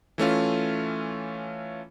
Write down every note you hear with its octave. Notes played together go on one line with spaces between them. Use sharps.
E3 A3 C#4 F4